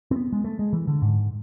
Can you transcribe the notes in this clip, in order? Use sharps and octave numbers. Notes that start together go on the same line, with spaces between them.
C4
B3
G#3
A3
G#3
E3
D3
G#2